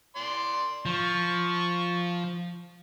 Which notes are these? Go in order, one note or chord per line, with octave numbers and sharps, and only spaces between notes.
D5 C6
F3 C#6